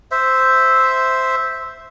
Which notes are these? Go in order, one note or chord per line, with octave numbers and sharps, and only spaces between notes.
C5 E5